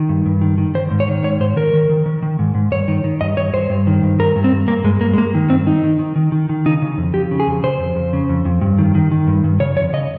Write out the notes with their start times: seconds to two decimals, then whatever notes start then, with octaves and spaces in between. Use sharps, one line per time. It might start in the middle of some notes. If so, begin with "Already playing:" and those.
Already playing: D#3
0.09 G2
0.26 G2
0.41 D#3
0.58 D#3
0.75 D#3 C5
0.91 G#2
1.00 C#5
1.08 D#3
1.23 G#2 C#5
1.40 G#2 C5
1.56 D#3 A#4
1.73 D#3
1.89 D#3
2.06 D#3
2.22 D#3
2.39 G#2
2.55 G#2
2.72 G2 C#5
2.88 D#3
3.04 D#3
3.21 G2 D#5
3.37 G2 C#5
3.53 G2 C5
3.70 G2
3.87 D#3
4.03 G2
4.19 G2 A#4
4.36 G2
4.44 C4
4.52 G2
4.68 G2 A#3
4.84 G2 G#3
5.01 G2 A#3
5.13 G#3
5.18 G2 A#3
5.35 D#3
5.50 G2 C4
5.67 D#3 D#4
5.84 D#3
5.99 D#3
6.16 D#3
6.32 D#3
6.49 D#3
6.66 C#3 D#4
6.82 C#3
6.98 F2
7.14 F2 G4
7.31 C#3
7.40 G#4
7.47 F2
7.64 C#3 C5
7.80 F2
7.96 F2
8.13 C#3
8.29 F2
8.45 F2
8.61 G2
8.79 D#3
8.95 D#3
9.11 D#3
9.27 G2
9.44 G2
9.60 C#3 C#5
9.76 F2 C#5
9.93 C#3 D#5